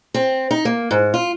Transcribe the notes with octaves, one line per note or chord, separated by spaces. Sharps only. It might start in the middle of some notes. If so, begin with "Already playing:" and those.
C4
D#4
A#3
G#2
F4